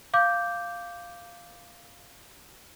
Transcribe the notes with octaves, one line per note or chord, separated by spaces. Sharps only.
F5 D6 G6